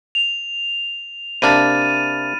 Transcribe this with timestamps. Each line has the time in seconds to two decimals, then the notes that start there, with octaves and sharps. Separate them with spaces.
0.15 F7
1.42 C3 A#3 D4 B5 F6 A6 D#7